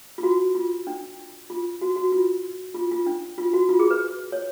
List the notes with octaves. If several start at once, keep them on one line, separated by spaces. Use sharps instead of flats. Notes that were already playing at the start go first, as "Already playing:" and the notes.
F4
F#4
F4
D4
F4
F#4
F#4
F4
F4
F4
D4
F4
F#4
F4
G#4
B4
C#5